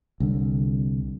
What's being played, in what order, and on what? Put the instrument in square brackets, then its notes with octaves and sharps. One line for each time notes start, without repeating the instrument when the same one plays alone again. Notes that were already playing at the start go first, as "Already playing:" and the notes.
[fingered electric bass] C2 D3